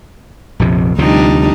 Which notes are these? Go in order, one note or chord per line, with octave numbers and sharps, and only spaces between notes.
A#1 F2 C3
D2 C3 F3 G3 D4 D#4